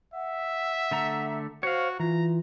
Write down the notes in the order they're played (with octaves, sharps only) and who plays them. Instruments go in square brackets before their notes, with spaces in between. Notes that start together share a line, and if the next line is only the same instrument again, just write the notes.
[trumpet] E5 [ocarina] F#5
[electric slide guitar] D3 A3 A#5
[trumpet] F#4 [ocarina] C5 [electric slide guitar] C#5 F5
[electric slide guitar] E3 [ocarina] F4 [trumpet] A#5